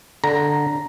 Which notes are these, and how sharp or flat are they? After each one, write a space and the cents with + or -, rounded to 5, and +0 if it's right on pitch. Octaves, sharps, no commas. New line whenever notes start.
D3 +0 A#5 +0